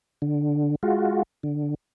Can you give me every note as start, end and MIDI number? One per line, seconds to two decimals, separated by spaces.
0.22 0.75 50
0.83 1.23 56
0.83 1.23 65
0.83 1.23 66
1.43 1.74 50